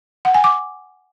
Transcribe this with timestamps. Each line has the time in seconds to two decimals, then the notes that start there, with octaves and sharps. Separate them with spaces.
0.25 F#5
0.34 G#5
0.44 D6